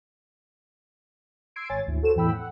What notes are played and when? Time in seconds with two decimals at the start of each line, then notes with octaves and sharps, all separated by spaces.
1.56 C6 E6 G#6 C7 D7
1.69 G#1 C#5 G#5 A6
1.86 G#1 D2 E4
2.03 F#4 A4 C5 E7
2.16 E2 A2 E3 G5 B5 E6
2.32 F#5